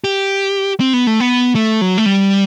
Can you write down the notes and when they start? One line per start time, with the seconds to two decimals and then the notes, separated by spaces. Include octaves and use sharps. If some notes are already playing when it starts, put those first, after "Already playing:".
0.04 G4
0.80 C4
0.94 B3
1.07 A3
1.20 B3
1.55 A3
1.81 F#3
1.98 A3
2.06 G3